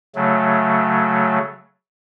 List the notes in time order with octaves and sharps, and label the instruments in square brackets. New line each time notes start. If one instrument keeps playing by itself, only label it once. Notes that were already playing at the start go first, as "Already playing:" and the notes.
[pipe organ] C#3 F#3 A3